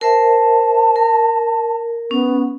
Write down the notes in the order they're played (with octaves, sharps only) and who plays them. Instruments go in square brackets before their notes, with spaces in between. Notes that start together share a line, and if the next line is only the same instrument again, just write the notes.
[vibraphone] A#4 C5 E5 [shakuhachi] A5
[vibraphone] A#4
[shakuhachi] B3 [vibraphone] C#4